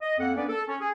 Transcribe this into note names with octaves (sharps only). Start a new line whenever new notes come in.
D#5
F2 A#3 C4 A4 F#5
A#3 B3 C#4 D4 B4 D5
A4
C#4
G#4